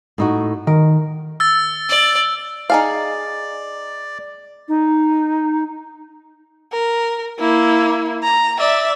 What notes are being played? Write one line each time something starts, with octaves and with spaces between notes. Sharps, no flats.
A2 D#4 F#4
D#3 A#4
E6 A6
D5
D#4 G#4 D5 F5
D#4
A#4
A#3 E4
A#5
D5 E5